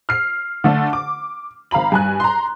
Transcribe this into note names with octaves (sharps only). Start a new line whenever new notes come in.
F6 C7
D3 A3 D4
D6
G#1 F5 A#5 B5 F#7
G2 G#5 F#6
A#5 C6